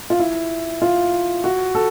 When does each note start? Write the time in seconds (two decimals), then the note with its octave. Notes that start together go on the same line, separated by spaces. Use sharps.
0.10 F4
0.20 E4
0.82 F4
1.44 F#4
1.75 A4